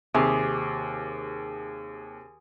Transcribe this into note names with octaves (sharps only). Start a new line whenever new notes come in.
D#2 C3 G#4